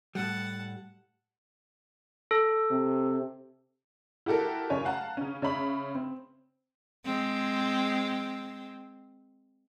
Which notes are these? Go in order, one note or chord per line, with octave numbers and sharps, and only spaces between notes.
A2 G3 F#5 A5
A4
C3
E4 F#4 G4 A4 A#4
F#1 C#3 C#5 G#5
F5 F#5 A5 A#5
C#3 C#4
C#3 C#5 E5 B5 F#7
C4
G#3 C4